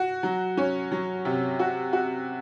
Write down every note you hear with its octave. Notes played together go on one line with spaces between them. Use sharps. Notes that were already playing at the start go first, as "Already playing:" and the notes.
Already playing: F#4
F#3
C#4
F#3
C3
F#4
F#4